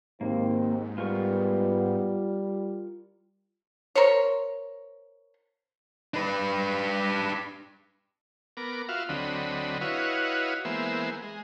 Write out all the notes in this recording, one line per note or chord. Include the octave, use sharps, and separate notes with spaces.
D#2 G#2 A#3 C4
G3 B3 F4 A#4 C#6
A#4 C5 C#5
D4 B4
B3 A#4 D6
F4 F#4 E5 F5
D2 D3 F#3 C4 D#5 B5
E4 F#4 B4 C#5 D#5 F5
E3 G#3 A#3 B3 C5 E5
G#3